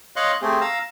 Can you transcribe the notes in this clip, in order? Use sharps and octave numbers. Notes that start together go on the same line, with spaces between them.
C#5 D#5 F5 C6 C#6 F#6
A3 C4 G4 G#4
F5 A#5 E6